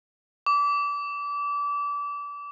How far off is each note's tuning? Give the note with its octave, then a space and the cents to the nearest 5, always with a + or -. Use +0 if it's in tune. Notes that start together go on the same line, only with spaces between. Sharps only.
D6 -25